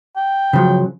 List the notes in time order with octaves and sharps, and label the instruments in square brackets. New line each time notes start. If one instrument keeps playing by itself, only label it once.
[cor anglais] G5
[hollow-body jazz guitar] C#3 F3 F#3